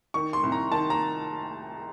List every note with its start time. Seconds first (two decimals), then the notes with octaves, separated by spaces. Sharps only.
0.14 D#3 C#6
0.33 C6
0.43 C2
0.52 A#5
0.71 D#3 A5
0.90 A#5